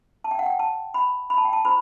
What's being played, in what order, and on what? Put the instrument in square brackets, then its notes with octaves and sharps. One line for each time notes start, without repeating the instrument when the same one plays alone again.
[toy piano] A5
G5
F#5
G5
A5
B5
B5
A5
G5
A5
E4 A4 C5 B5